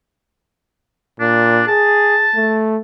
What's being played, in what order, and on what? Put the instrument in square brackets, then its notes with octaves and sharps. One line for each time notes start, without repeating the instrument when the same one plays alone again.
[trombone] A#2 [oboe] D4
[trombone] G#4 [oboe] A5
[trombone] A3